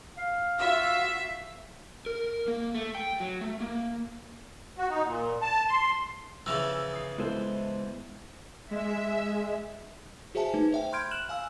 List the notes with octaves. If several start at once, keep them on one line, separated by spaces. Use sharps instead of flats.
F5
F4 F#4 E5
A#4
A#3
A3
G5
F#3
A3
A#3
F#4
D#4
A#2
A5
C6
C#3 E3 F3 E6 A#6 F7
D#6 C7
G#3 B3 E4 A4 C5
G#3 E5
F#4 G#4 C5 E5 G#5 A5
A3 D#4 B4
C5 E5 G5
B5 C6 F6 G6 G#6 D7
F6 F#6 E7 F#7
F5 G#5 E6